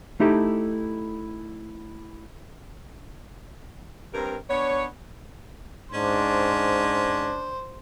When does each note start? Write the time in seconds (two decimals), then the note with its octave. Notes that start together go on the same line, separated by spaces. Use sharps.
0.20 A3 D#4 E4 G4 A4
4.14 G2 C4 A#4
4.50 B3 D4 C#5
5.93 G#2 C#4 D4 C5